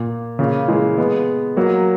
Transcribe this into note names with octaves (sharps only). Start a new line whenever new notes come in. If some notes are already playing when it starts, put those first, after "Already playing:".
Already playing: A#2
A#2 C#3
E3 G#3
G#3 B3
F#3 A#3